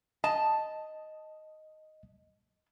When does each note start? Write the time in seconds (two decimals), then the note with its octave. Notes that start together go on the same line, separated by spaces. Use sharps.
0.24 D#5 A5